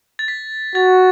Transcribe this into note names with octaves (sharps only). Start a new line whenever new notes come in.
A6
B6
F#4 A6